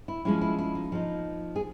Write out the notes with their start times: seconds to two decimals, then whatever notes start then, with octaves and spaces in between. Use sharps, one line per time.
0.08 E4
0.25 F3 G#3 C#4 E4
0.41 E4
0.59 E4
0.75 D#4
0.92 F3 A#3 D#4
1.56 G#4